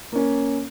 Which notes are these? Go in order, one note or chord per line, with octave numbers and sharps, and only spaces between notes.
A#3 C#4